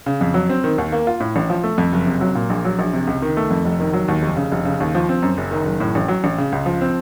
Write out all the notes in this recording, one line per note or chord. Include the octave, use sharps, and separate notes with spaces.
C#3
F2
F#3
C4
D#3
D#2
A#3
F4
A2
A1
F3
A3
F2
F#1
C3
F#3
A#2
A#1
F#3
A#1
C3
C#2
D#3
A3
F2
F1
D#3
F#3
D#2
F1
C#3
F1
C#3
D#2
F3
C4
F#2
F#1
D#3
F#1
A2
A1
F#3
A1
C#3
C#2
F3
C4